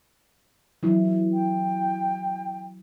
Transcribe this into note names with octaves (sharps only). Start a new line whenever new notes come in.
E3 F#3 E4
G5